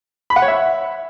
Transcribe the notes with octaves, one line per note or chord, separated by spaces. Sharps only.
B5
F#5
C#5
E5